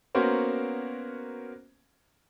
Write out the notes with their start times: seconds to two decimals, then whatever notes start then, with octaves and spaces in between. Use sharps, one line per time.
0.15 A#3 B3 C#4 F#4 A#4 C5